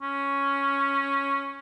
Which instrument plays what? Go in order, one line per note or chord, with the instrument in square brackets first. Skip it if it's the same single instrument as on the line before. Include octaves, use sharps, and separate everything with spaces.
[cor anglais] C#4